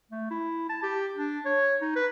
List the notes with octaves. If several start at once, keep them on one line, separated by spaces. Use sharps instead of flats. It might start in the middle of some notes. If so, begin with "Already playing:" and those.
A3
E4
A5
G4
D4
C#5
D#4
B4